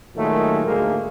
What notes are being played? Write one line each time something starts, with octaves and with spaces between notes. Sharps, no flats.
A#2 D#3 F#3 G#3 A3
D2 G#2 G#3 A#3 G#4